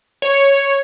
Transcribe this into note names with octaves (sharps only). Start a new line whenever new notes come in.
C#5